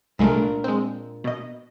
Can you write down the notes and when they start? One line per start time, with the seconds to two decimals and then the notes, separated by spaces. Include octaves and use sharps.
0.19 C2 A#2 G#3 A3 D4 A#4
0.64 G#3 C4
1.24 B2 D#5